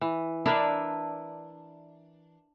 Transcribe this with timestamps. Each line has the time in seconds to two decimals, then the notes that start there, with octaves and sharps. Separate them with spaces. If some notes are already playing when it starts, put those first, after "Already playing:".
0.01 E3
0.46 D4 E4 A#4 B4